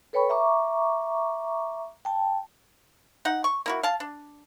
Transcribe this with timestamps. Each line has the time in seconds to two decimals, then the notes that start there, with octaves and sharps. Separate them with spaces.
0.13 A4 B4 C#5 G5 B5 C#6
0.29 E5 A#5 C#6 D6
2.05 G5 A5
3.25 D#4 F#5
3.44 C#6
3.66 A#3 E4 F#4
3.83 F5 A5
4.00 D4